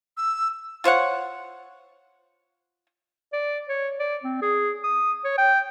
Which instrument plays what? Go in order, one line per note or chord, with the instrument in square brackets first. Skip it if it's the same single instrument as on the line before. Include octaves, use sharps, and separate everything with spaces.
[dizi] E6
[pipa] F4 C5 C#5 F#5
[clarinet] D5
C#5
D5
C4
G#4
D#6
C#5
G5